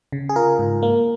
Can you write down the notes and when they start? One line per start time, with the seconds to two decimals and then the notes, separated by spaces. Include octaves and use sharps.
0.12 C#3
0.29 G#4
0.36 F4 A#4
0.59 G#2
0.83 A#3